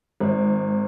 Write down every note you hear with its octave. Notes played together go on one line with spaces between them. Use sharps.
G#1